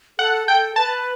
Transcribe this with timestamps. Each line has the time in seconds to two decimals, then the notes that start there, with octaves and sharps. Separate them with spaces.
0.19 A4 F#5
0.47 A4 G5
0.76 B4 A5